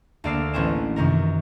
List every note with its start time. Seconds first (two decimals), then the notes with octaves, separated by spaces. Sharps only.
0.24 D2 A#3 D5 E6 F6 C7
0.53 A1 B3 C#4 C5 G#5 E7
0.96 F#2 C3 D#3 A#4